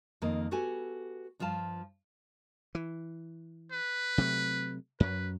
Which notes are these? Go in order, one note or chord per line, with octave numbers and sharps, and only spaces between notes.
F2 D#3 A#3 D#5
B3 F#4 G4 A4 G#5
G2 F3 F4 F5 A5
E3
B4
C3 F#3 A3
F#2 F#3 B4